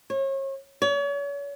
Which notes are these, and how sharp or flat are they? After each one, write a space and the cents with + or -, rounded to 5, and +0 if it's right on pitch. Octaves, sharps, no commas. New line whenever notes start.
C#5 -35
C#5 +40